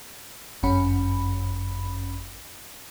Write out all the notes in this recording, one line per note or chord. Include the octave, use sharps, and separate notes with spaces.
G1 F#2 C#4 B5